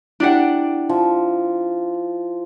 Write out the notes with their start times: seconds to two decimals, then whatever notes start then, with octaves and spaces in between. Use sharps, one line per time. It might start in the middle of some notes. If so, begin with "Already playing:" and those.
0.20 D4 E4 G4 F#5
0.89 F3